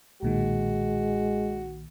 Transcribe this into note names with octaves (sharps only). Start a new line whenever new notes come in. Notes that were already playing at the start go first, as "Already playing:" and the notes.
B1 A#2 D#3 G#3 F#4